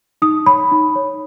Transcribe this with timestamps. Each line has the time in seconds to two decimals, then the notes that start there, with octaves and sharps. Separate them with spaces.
0.22 D#4 D#6
0.46 C#5 B5
0.72 D#4
0.95 C#5